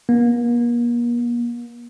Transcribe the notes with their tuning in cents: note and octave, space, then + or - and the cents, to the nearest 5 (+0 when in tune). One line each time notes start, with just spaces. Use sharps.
A#3 +40